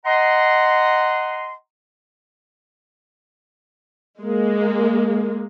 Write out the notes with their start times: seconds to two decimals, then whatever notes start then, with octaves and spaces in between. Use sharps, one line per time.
0.05 D#5 F#5 A#5 C6
4.21 G#3 A#3